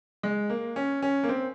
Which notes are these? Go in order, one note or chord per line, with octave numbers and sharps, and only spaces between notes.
G#3
A#3
C#4
C#4
A#3
C4